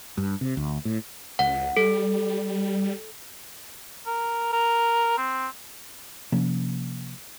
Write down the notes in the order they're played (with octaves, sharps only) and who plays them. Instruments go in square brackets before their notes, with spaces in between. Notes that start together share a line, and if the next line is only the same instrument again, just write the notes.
[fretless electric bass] G2
C3
D2
A2
[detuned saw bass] C#2 [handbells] F#5
[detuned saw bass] G3 [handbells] A4
[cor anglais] A#4
A#4
C4
[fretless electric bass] C3 F3 A#3 C#4